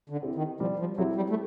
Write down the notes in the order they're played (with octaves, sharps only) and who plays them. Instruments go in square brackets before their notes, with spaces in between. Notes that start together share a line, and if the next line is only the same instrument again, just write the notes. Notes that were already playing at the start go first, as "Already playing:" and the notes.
[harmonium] D3
[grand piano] C4 E4 G4
[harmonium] D#3
[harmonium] F3 [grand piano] G3
[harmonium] F3
[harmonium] F#3 [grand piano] C4 E4 G4
[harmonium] G3
A3